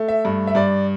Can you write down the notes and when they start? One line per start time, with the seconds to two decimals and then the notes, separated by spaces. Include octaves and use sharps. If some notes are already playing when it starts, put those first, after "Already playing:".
Already playing: A3
0.08 E5
0.25 G2
0.47 E5
0.55 G2 D5